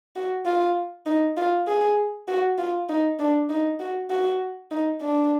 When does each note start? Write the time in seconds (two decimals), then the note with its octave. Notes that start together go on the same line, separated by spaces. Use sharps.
0.16 F#4
0.46 F4
1.06 D#4
1.37 F4
1.68 G#4
2.28 F#4
2.58 F4
2.89 D#4
3.19 D4
3.49 D#4
3.80 F#4
4.10 F#4
4.71 D#4
5.01 D4